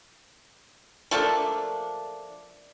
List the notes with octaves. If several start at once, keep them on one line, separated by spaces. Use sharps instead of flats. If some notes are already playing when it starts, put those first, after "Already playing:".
F3 A3 A#3 D4